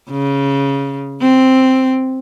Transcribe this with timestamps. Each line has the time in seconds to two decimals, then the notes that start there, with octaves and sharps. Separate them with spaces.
0.11 C#3
1.22 C4